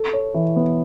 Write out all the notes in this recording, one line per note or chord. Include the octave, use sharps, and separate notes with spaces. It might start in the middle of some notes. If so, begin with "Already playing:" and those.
Already playing: A4
C#5
E3
B3